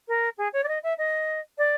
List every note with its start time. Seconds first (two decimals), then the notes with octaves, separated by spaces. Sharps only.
0.08 A#4
0.38 G#4
0.53 C#5
0.64 D5
0.68 D#5
0.83 E5
0.98 D#5
1.58 D5